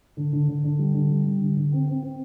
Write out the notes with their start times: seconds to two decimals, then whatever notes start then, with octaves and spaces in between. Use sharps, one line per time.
0.17 D3
0.33 D3
0.48 D3
0.64 D3
0.79 G3
0.94 D3
1.10 G3
1.26 G3
1.41 D3
1.56 D3
1.72 C4
1.88 C4
2.02 C4